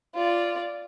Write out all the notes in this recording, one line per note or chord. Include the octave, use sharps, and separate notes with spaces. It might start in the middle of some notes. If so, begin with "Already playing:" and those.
F4 D5